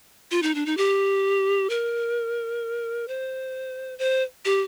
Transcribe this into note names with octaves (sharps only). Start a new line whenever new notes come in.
F4
D#4
D4
D#4
G4
A#4
C5
C5
G4